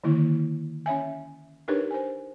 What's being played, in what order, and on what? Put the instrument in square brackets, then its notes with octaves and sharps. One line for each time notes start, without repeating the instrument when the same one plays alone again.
[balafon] D3 D#3 A#3 E4
C#4 C#5 E5 G#5
D4 D#4 G4 A#4 B4 C#5
C5 G#5